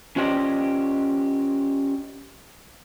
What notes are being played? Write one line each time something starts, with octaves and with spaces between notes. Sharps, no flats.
C#4 F4 G4 C5 D5 D#5